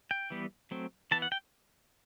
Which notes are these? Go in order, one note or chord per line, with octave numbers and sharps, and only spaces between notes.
G5
E3 G3 B3
F#3 A3 C4
E3 B3 A5
F#5
G5